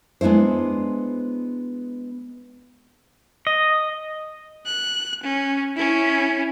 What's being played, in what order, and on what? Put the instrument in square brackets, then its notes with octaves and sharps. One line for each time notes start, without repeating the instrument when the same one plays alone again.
[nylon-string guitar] G#3 B3 D4 E4 C5
[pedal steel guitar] D#5
[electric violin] F#6
C#4
C#4 E4